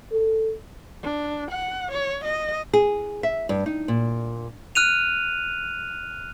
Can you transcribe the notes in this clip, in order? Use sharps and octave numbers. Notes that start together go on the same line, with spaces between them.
A4
D4
F#5
C#5
D#5
G#4
E5
G2
D#4
A#2
F6 F#6 D#7 F7